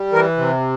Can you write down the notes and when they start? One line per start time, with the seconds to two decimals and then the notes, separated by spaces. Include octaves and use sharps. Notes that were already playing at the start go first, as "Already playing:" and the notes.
Already playing: G3
0.12 E3 A#4
0.37 C3